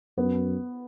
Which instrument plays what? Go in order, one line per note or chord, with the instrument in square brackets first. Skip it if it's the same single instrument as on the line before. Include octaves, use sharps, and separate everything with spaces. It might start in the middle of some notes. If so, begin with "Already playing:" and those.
[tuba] F#2 [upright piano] B3